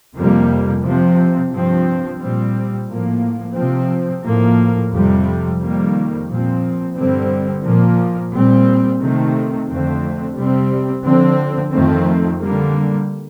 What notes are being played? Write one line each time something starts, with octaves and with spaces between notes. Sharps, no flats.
F2 C3 G3 A#3
C3 F3 C4
G2 F3 C4
A#2 G3 C4
A2 F3 A#3
C3 F3 C4
A2 F3 A#3
F2 C3 G3
F2 D#3 G3 A#3
A#2 F3 C4
G2 D3 G3 C4
A#2 F3 A#3
A#2 G3 C4
C3 D#3 A3 C4
F2 D3 F3 A3 C4
C3 G3 C4
D3 F3 C4
F2 D#3 A3 C4
D3 G3 A#3